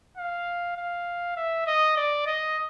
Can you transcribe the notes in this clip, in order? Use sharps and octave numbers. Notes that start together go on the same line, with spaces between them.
F5
F5
E5
D#5
D5
D#5